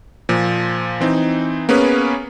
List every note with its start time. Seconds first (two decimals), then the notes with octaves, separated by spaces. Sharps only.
0.29 A#2 F3
1.01 E3 C4 D#4
1.69 A#3 B3 C#4 G#4 B4